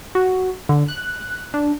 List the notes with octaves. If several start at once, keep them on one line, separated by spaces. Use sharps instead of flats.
F#4
D3
F#6
D4